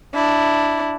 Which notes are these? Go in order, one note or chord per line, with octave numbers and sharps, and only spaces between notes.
D4 E4